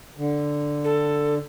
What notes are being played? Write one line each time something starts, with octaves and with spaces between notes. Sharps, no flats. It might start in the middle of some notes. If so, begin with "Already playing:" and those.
D3
A4